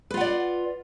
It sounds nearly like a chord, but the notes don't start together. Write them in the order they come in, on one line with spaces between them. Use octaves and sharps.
B4 F4 F#5 D5